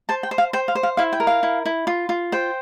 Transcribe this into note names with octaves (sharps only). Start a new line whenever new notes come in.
C5 A5
G5
C5
F5
C5 G5
F5
C5
F5
E4 F5
G5
A#4
F5
E4
E4
F4
F4
C5 G5